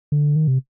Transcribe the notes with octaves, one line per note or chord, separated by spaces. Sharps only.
D3
D#3
C3